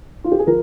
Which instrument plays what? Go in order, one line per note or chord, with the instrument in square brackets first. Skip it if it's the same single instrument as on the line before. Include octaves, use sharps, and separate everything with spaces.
[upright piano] F4
G4
G#4
F3 A#4